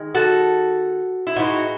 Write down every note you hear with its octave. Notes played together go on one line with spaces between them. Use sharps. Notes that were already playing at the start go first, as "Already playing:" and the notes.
Already playing: D#3 G#3
F#4 A4
E4
A2 E3 G#3 D#4 F#4